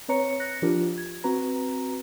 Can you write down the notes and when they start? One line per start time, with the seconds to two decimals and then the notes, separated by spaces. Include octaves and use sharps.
0.09 C4 B4 C#5 A#5 C#7
0.40 F#6 A#6 C#7
0.62 F3 D4 F4 G4 A#4
0.98 G#6
1.24 C4 F#4 B4 A#5